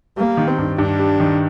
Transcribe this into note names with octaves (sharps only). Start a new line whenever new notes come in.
G3 A#3
D#3
C4
G2
G2 D4
G3
D#3